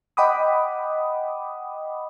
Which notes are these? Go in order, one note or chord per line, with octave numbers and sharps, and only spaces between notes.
D#5 F#5 G5 B5 D6 D#6